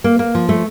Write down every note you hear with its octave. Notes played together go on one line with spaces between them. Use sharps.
A#3
A#3
F3
A3